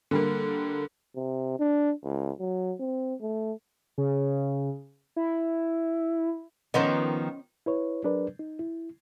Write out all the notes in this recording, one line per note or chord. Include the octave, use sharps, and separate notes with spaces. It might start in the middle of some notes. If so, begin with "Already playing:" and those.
D3 G3 A#3
C3
D4
C#2
F#3
C4
A3
C#3
E4
D#3 F3 B3 C#4 C5 D#5
E4 B4 C#5
F#3 D4 G#4 A#4 B4 D5
D#4
E4